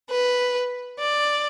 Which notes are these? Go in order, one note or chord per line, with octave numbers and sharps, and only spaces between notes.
B4
D5